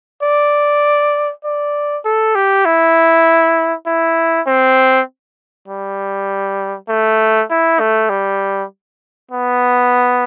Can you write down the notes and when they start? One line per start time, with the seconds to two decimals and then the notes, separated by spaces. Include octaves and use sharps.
0.22 D5
1.44 D5
2.05 A4
2.35 G4
2.65 E4
3.86 E4
4.47 C4
5.68 G3
6.89 A3
7.50 E4
7.79 A3
8.09 G3
9.31 B3